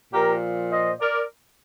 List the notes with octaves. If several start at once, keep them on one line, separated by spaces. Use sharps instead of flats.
A#2 F3 G4 A#4
C5 D#5
A#4 D5